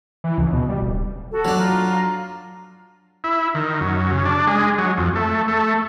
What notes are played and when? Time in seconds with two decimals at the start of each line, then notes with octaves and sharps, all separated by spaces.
0.24 E3
0.38 C#2
0.53 B2
0.69 G3
0.83 D1
1.31 F#4 A4
1.45 F#3 D4
1.58 F4 A#5
3.24 E4
3.55 D#3
3.81 F#2
4.11 C#3
4.25 D4
4.47 G#3
4.78 F#3
4.97 F2
5.15 A3
5.48 A3